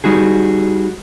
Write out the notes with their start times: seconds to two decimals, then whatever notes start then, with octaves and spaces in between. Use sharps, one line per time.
0.04 G3 D#4 F#4 G#4